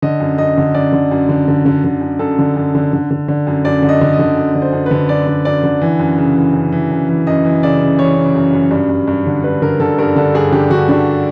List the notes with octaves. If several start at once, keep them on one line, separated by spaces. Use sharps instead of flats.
D3 D#5
F#2
F#2 D#5
D3
F#2 D5
D3
F#2
D3
D3
D3
D3
F#2
F#2 A4
D3
F#2
D3
D3
D3
D3
F#2
F#2 D5
D3
D#5
D3
D#5
D3
F#2
D3
C5
F#2
B4
D3
F#2 D5
D3
F#2 D5
D3
E3
F#2
C#3
E3
F#2
E3
F#2
E3
F#2 D#5
E3
C#3 D5
C#3
E3 C#5
C#3
F#2
F#2
G2
G2
G2
D3
G2 B4
D3 A#4
D3 A4
G2 A#4
D3 A4
G2 G#4
D3 G4
D3 F#4
D3 D4